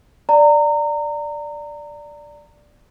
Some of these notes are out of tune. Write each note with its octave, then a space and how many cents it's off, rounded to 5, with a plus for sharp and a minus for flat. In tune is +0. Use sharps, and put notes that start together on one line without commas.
D5 +0 A#5 -25